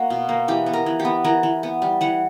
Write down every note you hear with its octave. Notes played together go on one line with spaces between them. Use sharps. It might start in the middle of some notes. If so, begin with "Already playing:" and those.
Already playing: A#3 F#4
B2
A#3
E3 G4
B3
A#4
E3
G4
B3
E3 A#4
E3
B3
G3
E3 F#5